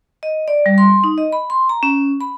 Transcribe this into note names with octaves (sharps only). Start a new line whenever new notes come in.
D#5
D5
G3
C6
D#4
D#5
B5
C6
A#5
C#4
B5